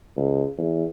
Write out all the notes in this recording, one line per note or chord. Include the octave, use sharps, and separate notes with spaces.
C#2
E2